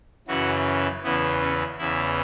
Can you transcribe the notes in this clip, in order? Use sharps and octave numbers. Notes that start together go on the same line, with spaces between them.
F#2 C#3 E3 F#4
E2 C#3 E3 B3
C#4
E2 C#3 E3 E4